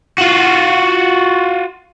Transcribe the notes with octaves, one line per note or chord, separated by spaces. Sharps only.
F4 F#4